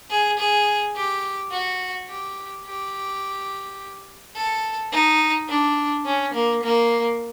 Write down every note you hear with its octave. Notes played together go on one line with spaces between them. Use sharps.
G#4
G#4
G4
F#4
G4
G4
A4
D#4
D4
C#4
A#3
A#3